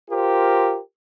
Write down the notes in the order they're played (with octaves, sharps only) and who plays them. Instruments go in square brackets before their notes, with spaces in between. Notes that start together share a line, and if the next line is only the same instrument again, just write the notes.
[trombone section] F4 G4 A#4 C5